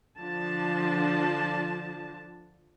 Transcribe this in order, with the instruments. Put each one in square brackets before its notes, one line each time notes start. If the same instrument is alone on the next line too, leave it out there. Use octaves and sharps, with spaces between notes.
[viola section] D3 F3 D4 A5